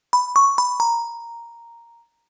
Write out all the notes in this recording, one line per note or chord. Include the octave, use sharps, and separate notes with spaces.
B5
C#6
B5
A#5